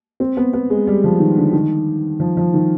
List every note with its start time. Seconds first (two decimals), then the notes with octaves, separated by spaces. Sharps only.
0.20 C4
0.37 B3
0.53 B3
0.70 G#3
0.87 G3
1.04 F3
1.20 D#3
1.37 D3
1.53 D#3
2.20 F3
2.37 F3
2.54 D#3